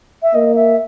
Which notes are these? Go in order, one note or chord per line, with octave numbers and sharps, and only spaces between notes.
E5
A#3 D#5
E5